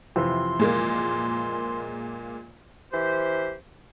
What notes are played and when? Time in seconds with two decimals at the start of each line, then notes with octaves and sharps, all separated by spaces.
0.16 F2 C3 E3 C6
0.59 A#2 G#3 A#3
2.92 E3 G4 C5